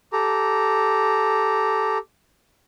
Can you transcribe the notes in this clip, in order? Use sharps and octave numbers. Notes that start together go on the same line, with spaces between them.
G4 A4 A#5